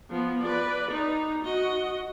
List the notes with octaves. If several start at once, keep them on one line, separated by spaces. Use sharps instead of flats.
F3 B3
B4 D5
D#4
F#4 D#5